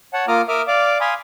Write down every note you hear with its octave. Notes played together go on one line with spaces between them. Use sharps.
C#5 F#5 A5
A#3 F4 A#5 D6 D#6 F6
A#4 E5 D6 D#6 F6
D5 F5 D6
F5 G#5 B5 C6 D#6